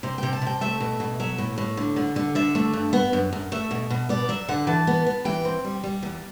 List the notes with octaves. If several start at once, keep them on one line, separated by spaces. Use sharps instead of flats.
C3 C5
C3 G5
A5
C3 G5
A3 E5
B2
B2
F#3 E5
A2
A2
D3
D3
D3
D3 E5
A3
G2
B3
F#2
F#2
A3 E5
B2
B2
B3 D5
F#3 E5
D3 F#5
E3 A5
B3
B3
E3 G5
C4
G3
G3
E2